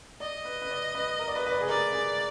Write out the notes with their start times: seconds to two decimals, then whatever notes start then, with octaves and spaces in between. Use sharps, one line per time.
0.20 D5 D#5
0.45 B4
0.62 B4
0.70 D5
0.94 B4
1.19 A#4
1.28 D5
1.36 B4
1.47 B4
1.52 D5
1.61 G#4
1.69 A#4 D5
1.93 G#4